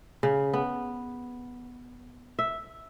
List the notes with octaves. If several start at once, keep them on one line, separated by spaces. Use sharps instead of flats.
C#3
B3
E5